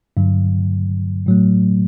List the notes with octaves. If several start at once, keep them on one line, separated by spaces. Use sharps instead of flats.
G2 D3 F#3
A2 F#3 A3